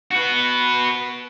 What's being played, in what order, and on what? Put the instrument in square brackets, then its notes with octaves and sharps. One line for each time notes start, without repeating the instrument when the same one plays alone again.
[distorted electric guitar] F#4 B4